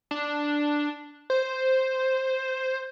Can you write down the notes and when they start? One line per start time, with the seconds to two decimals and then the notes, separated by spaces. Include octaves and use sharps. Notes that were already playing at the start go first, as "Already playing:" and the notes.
0.11 D4
1.30 C5